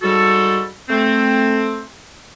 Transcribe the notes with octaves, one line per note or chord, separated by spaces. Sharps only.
G#2 G3 F#4 A4
A3 C4